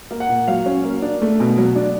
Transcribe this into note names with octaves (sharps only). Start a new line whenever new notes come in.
A#3
F#5
A#2
F#3 F5
C#4
A#3
D4
A3
B2
F#3
D4